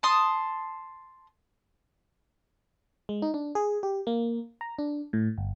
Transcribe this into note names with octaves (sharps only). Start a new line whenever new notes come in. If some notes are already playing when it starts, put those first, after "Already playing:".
A5 C6 D#6
G#3
D#4
D4
G#4
G4
A#3
A#5
D4
A2
G1